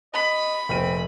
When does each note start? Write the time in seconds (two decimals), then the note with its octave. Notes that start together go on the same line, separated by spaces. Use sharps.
0.14 D#5 B5
0.69 F1 A#2 C4 D#7